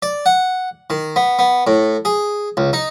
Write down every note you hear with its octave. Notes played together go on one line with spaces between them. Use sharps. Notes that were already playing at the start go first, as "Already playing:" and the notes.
D5
F#5
D#3
B3
B3
A2
G#4
C#2
D#4